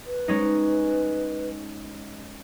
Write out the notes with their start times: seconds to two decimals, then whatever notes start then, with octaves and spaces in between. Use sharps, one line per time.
0.06 B4
0.28 G#3 C#4 D#4